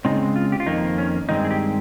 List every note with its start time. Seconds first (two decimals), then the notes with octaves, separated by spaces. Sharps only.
0.05 C#3 G#3 C4 D#4
0.36 F4
0.52 G4
0.60 F4
0.66 F2 D#3 A#3 D#4
0.98 C#4
1.29 G2 D#3 G#3 C4 D#4
1.45 G#4
1.51 G4